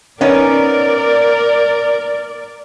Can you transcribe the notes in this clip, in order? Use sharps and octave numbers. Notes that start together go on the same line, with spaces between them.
B3 C#4 D#4 A#4 D5